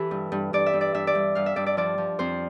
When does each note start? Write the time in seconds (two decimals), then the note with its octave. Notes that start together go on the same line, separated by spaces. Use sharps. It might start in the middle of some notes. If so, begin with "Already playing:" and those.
Already playing: E3 G4 A4 B4
0.11 G2
0.32 G2
0.53 G2 D5
0.66 E5
0.73 G2
0.81 D5
0.94 G2 E5
1.07 D5
1.15 G2
1.35 G2 F5
1.46 E5
1.56 G2 D5
1.66 D5
1.77 F3 D5
1.98 F3
2.19 F2 C5